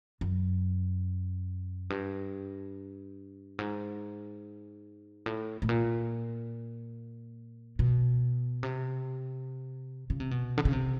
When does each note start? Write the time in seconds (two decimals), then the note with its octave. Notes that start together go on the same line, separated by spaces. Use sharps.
0.21 F#2
1.90 G2
3.59 G#2
5.26 A2
5.62 A2
5.69 A#2
7.79 B2
8.63 C3
10.10 C#3
10.20 C3
10.31 B2
10.58 D3
10.65 C#3
10.73 C3